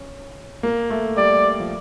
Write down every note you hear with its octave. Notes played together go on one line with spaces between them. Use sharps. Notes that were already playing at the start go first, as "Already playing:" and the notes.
Already playing: C#4
A#3
A3
G3 D5
F3